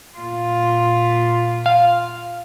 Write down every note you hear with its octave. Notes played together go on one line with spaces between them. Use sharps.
A#2 F4
F5